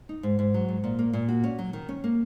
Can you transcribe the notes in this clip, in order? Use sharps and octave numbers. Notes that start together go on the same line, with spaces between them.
D#4
G#2
G#2
F#3
G#2
A#2
A#3
A#2
F#4
C#4
F#3
D#3
C#4
A#3